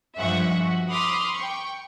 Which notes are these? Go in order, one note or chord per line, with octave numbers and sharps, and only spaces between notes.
G2 F3 G#3 E5 F#5 C#6
F#4
B5 C6 D6 D#6 F6
G5 C#6